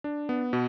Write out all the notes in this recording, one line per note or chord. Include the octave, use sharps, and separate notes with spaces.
D4
B3
B2